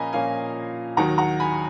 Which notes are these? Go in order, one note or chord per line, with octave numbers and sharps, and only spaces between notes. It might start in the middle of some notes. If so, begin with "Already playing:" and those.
Already playing: A#2 F3 A#3 C#4 D#5 G#5 A#5 B5
A#2 F3 A#3 C#4 F5 G#5
D#2 D#3 F#3 F#5 A#5
F#5 A#5
G#5 B5